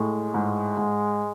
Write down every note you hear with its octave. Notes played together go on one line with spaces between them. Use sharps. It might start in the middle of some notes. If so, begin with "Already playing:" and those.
Already playing: A2 G#3
G#2
G#2